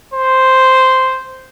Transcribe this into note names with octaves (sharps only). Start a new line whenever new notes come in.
C5